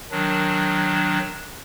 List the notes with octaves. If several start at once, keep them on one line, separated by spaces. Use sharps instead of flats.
D#3 F#3 D4